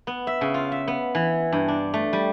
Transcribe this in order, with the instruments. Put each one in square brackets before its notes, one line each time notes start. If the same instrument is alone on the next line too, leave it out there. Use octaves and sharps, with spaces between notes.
[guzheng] B3
E5
C#3
F4
E5
B3
E3
G2
D4
A3
G3